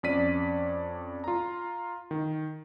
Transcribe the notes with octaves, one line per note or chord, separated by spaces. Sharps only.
F2 C#4 D5 B6 D#7
F4 A#5
D#3